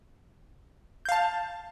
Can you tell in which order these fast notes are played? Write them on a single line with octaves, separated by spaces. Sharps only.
G6 F5 A5